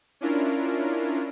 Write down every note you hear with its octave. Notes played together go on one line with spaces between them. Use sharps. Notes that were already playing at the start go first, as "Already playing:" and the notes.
C#4 D4 E4 F4 A#4